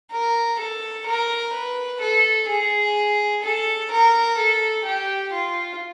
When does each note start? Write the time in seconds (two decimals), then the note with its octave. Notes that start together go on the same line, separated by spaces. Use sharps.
0.12 A#4
0.59 A4
1.06 A#4
1.54 B4
2.01 A4
2.48 G#4
3.43 A4
3.92 A#4
4.38 A4
4.86 G4
5.33 F4